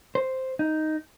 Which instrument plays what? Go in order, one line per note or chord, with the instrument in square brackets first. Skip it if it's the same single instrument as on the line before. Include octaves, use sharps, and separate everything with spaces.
[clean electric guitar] C5
D#4